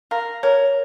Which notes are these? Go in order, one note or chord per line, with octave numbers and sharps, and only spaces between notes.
A#4 F5
A#4 C#5